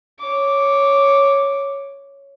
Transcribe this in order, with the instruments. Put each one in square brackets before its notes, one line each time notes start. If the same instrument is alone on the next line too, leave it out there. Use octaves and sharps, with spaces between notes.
[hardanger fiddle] C#5 D6